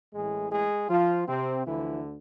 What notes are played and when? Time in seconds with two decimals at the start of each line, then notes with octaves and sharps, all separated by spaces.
0.13 A1 A2 E3 G#3 G#4
0.51 G#3 G#4
0.89 F3 F4
1.27 C3 C4
1.65 D2 D3 E3 F3 E4